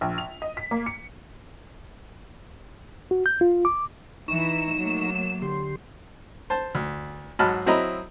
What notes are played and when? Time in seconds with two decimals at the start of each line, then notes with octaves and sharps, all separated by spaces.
0.01 A#1
0.18 F7
0.42 D#5
0.57 B6
0.71 A#3
0.86 C#7
3.11 F#4
3.26 G6
3.41 F4
3.65 D6
4.28 E3 D#4 E4 A#5 C#6 E7
4.75 F#3 A3 A#3
5.42 D3 G4 C6
6.50 C5 A5
6.75 D2
7.39 G#2 F#3 D#5 A5 B5 F6
7.66 F#3 C4 E4 D#5 A#5 B5